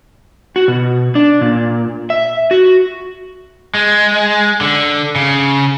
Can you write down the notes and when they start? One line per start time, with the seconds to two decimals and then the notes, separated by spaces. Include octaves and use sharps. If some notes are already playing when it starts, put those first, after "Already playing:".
0.56 F#4
0.68 B2
1.15 D4
1.41 A#2
2.10 E5
2.51 F#4
3.75 G#3
4.61 D3
5.16 C#3